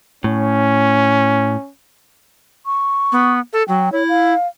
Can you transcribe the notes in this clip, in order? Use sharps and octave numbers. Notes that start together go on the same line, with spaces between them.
A2 C#4
C#6
B3
A4
F#3 G5
E4 C#5
F5